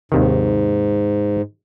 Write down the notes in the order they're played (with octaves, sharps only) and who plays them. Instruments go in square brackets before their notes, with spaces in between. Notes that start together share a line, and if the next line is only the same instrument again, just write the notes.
[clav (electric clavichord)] D#2 C3 D#3 [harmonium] G#2